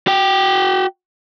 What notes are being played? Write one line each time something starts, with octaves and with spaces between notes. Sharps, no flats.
F#4 G5